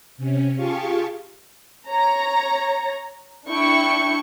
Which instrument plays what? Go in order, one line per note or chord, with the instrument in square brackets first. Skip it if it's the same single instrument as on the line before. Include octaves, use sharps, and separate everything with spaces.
[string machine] C3 C#4
F4 G4 G#4 F5 A5 C#6
[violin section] C#5 A#5
D4 E4 G5 C#6 C#7